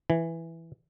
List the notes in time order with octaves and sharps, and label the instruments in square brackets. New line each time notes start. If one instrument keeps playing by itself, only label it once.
[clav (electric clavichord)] E3